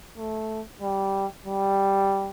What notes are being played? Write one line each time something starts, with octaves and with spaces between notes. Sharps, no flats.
A3
G3
G3